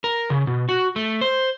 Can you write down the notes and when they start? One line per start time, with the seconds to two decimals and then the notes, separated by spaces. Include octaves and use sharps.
0.04 A#4
0.30 C#3
0.47 B2
0.69 F#4
0.96 A3
1.21 C5